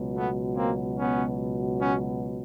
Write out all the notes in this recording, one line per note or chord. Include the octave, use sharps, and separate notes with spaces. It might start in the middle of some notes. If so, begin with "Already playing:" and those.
Already playing: C#2 B2 F#3
A3 B3
A#3 C4
B3 C#4
B3 C#4